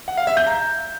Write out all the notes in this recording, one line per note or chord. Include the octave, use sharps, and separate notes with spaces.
F#5
F5
E5
G6
A#5